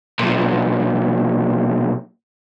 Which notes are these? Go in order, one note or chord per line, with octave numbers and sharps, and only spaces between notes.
B1 A#2